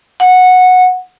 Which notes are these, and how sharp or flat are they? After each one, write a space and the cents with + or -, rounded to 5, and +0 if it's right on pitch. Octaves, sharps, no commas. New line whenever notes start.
F#5 -10